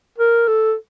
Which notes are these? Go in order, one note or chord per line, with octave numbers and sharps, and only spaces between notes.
A#4
A4